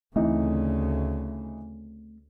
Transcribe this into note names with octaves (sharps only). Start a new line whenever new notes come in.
D2 C#3 E3 A3 C4 D#4